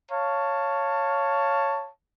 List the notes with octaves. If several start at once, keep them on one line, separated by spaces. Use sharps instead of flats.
C#5 F5 A5